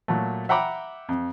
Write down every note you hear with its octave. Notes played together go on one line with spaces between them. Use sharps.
A#2 F#3 A3
E5 F#5 G5 A#5 B5 D6
F2